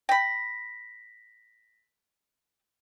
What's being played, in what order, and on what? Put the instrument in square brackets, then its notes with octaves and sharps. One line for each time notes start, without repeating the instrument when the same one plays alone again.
[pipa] G5 B5 [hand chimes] A#6 B6